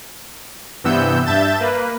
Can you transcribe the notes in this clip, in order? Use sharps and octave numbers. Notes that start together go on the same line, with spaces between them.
G2 C3 E3 B3 E6 G6
G2 E5 A5 G6 A6 E7
A#3 B4